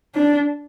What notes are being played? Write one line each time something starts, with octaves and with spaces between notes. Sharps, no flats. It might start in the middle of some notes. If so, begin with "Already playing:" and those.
D4